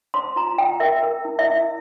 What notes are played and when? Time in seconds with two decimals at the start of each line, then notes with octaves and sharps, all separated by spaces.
0.14 C5 C6
0.36 F4 A#5
0.58 F4 G5
0.80 A#4 E5
1.03 A#4
1.25 E4
1.39 E5
1.47 E4